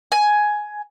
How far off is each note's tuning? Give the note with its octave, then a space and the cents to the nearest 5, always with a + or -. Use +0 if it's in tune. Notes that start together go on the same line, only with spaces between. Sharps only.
G#5 +10